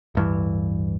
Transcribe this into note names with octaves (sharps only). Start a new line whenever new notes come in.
D1 G2 E3